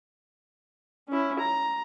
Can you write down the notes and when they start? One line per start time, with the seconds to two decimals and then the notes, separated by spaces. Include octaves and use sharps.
1.08 C#4 E4
1.39 A#5